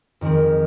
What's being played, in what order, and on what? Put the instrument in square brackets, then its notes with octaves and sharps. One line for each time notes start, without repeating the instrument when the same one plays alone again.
[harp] F2 D#3 G#3 C4